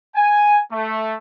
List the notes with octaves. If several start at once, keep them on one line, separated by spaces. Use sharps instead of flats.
G#5
A3